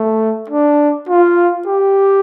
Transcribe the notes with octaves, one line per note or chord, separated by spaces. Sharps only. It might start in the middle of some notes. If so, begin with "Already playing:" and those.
Already playing: A3
D4
F4
G4